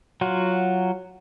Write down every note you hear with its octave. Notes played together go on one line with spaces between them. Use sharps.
F#3 F4 F#4